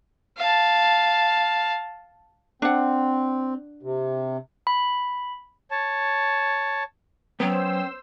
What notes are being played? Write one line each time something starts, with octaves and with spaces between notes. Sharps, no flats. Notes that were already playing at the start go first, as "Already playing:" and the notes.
F5 A5
C4 D4 F#5
C3
B5
C#5 A5
F#3 B3 C#4 C5 G5 E6